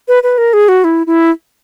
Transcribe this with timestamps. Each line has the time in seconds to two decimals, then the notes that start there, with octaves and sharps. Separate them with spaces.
0.08 B4
0.23 B4
0.38 A#4
0.53 G#4
0.69 F#4
0.84 E4
1.07 E4